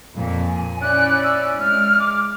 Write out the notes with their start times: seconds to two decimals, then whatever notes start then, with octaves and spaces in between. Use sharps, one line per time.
0.14 F2 A#2
0.49 G#5
0.82 C#4 E4 D5 F#6
1.24 E6
1.60 G#3 F6
2.00 D6